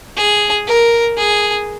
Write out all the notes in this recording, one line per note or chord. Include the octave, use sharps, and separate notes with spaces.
G#4
A#4
G#4